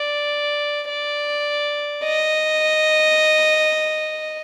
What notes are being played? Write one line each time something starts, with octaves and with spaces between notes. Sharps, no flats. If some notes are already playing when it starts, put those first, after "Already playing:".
Already playing: D5
D5
D#5